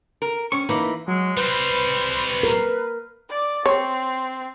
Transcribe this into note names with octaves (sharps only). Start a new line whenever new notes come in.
A#4
C4 C#4 C#6
E3 A#3 D#4 B5
F#3 G#3
G3 C4 B4 C5
A#4
D5 D6
C4 C#5